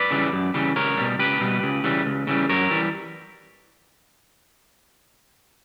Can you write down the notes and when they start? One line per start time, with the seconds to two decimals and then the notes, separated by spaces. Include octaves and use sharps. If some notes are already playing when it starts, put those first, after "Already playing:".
Already playing: B4 D5
0.11 C#3 E3 G3
0.32 F#2
0.54 C#3 E3 G3
0.76 C#2 A#4 C#5
0.98 B2 G3
1.19 C#2 G4 B4
1.41 B2 G3
1.63 C#2
1.84 C#3 E3 G3
2.06 C#2
2.27 C#3 E3 G3
2.49 F#2 A#4 C#5
2.71 E3 G3